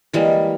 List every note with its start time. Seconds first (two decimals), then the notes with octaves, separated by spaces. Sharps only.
0.13 E3 G3 G#3 A#3